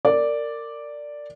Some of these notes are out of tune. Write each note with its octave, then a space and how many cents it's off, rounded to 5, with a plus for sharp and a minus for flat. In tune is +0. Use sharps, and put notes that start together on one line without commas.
A#4 -25 D5 +0